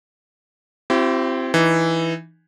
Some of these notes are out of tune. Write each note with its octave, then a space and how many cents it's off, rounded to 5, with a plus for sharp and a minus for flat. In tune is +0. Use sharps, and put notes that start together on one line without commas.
C4 +0 E4 +35 G4 -35
E3 +0 D#4 -5